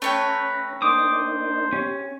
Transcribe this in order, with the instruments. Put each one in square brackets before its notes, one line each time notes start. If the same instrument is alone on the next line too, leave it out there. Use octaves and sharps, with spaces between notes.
[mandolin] A3 C#5 G5 [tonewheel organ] C#4 A#5 [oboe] B4
[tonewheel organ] A#3 D4 D#4 [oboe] C5 [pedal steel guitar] D6 D#6
[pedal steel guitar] C#4 [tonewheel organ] G4